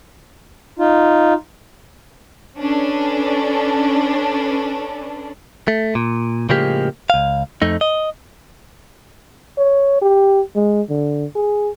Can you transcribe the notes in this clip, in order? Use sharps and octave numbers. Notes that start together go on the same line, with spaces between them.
D#4 F4
C#4 D4 A4 B4
A3
A#2
A2 C#3 F3 G#3 A#3 G4
C#2 F5
F2 A3 D#4
D#5
C#5
G4
G#3
D3
G#4